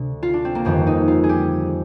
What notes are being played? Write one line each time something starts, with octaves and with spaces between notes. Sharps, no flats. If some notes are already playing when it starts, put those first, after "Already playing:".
Already playing: D2 C3
F4
D4
C4
A#3
G1 F2 D#3 C4
D#4
F4
G#4
G4